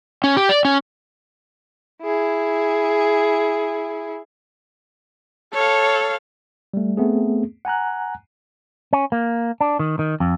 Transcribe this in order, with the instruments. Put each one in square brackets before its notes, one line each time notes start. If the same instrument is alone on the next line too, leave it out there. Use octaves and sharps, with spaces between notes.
[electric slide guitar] C#4
G4
D5
C#4
[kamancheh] E4 G#4
[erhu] A4 [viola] C#5 F5
[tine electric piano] G3 A3
A3 B3 C4 G#4
F#5 G#5 A#5 F#6
[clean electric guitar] C#4
A#3
D4
D#3
D#3
F2